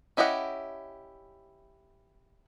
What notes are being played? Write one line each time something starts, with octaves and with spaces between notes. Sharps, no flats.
C#4 E4 G4 D#5 F#5